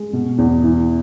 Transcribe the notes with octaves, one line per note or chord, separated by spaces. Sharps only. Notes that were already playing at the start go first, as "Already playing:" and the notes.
Already playing: G#3
B2
E2
E3